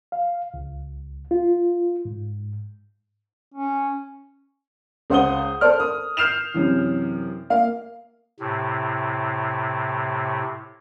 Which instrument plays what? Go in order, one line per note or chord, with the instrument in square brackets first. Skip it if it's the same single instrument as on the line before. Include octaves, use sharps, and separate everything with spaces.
[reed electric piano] F5
C#2
F4
G#2
[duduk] C#4
[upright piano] C#2 C5 F#5 D#6 G7
A4 A#4 C5 D5 F6
D#6
F6 G6 C7 E7 F7
F#2 C3 E3
A#3 F5
[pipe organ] A2 C3